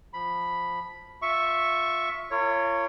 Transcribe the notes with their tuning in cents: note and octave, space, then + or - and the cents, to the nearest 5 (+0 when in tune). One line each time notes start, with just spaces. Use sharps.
F3 +0 B5 +0
F4 +15 E5 +0 C#6 +0
F4 -45 A#4 -40 C#5 +0